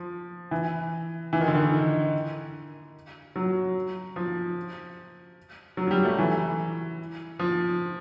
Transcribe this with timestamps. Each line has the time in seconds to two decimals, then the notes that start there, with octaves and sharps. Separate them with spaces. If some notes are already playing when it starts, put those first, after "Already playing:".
Already playing: F3
0.51 E3
1.33 E3
1.41 D#3
1.48 D3
1.54 D#3
3.36 F#3
4.16 F3
5.77 F#3
5.87 F#3
5.91 G3
6.05 A3
6.18 E3
7.39 F3